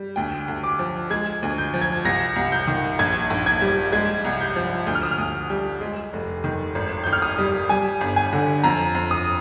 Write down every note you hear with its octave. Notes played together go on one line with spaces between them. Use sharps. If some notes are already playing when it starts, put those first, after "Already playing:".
Already playing: G3
D2 G5
D2
D6
F3
G#3 G#6
D2
G6
F3
G#6
C2 A#6
C2
G6
D#3
A#1 G#6
A#1
G#6
G3
G#3 G#6
C2
G6
F3
D2 G6
F6
D#6
F6
D2
G3
G#3
F1
D#3
G#1
G#1 G6
F6
D#6
G3
G3 G#5
G1
G#5
D3
F2 A#5
F2
D#6